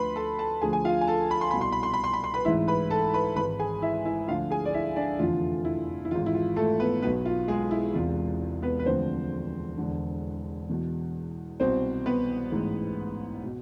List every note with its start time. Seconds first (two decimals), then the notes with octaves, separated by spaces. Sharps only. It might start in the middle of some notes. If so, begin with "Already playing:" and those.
Already playing: D2 D3 F3 B4 B5 C6
0.16 A4 A5
0.38 A4 A5
0.62 D2 D3 F3 G#4 G#5
0.73 G#5
0.85 F4 F5
1.01 G#5
1.07 A4 A5
1.31 B5
1.41 C6
1.51 C2 B2 B5
1.61 C6
1.72 B5
1.83 C6
1.93 B5
2.04 C6
2.13 B5
2.24 C6
2.34 B4 B5
2.45 A1 G#2 E3 E4 E5
2.67 B4 B5
2.90 A4 A5
3.14 B4 B5
3.36 G#1 G#2 E3 B4 B5
3.59 G#4 G#5
3.82 E4 E5
4.05 E4 E5
4.27 D2 D3 F3 F4 F5
4.51 G#4 G#5
4.65 D5
4.74 E4 E5
4.96 D4 D5
5.19 F1 E2 D3 F3 F4
5.65 E4
6.05 E4
6.11 G#1 G#2 E3 F4
6.26 E4
6.34 F4
6.56 A3 A4
6.80 B3 B4
7.02 B1 B2 B3 B4
7.25 F4
7.48 G#3 G#4
7.71 E4
7.94 E1 E2 C3 F4
8.62 B3 B4
8.79 B4
8.86 E1 D2 D3 F3 C4 C5
9.77 E1 E2 D3
10.69 E2 B2
11.60 C2 B2 C4 C5
12.06 B3 B4
12.51 A1 G#2 E3
13.44 B2